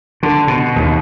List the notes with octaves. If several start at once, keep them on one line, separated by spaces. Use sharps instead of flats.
D3
B2
D#2